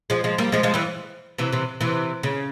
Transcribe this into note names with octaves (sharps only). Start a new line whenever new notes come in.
F3 G#3
F3 G#3
G3 A#3
F3 G#3
F3 G#3
E3 G3
C3 E3
C3 E3
C3 E3
C#3